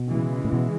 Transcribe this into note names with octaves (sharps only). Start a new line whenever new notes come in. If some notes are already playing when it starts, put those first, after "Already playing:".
Already playing: B2
C#3 E3 G#3
A2
B2